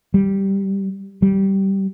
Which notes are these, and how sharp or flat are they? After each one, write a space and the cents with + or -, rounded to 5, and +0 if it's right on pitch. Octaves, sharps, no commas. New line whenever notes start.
G3 -5
G3 -15